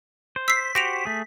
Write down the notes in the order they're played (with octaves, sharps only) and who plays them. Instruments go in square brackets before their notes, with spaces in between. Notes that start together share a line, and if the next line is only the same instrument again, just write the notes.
[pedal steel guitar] C5
[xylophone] E6 C7 [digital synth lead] B6
[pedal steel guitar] F#4 G4 C5 [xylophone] A#6 D7 F7
[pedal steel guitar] A3 G#4